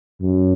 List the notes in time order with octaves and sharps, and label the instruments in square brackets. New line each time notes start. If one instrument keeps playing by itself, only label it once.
[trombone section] F#2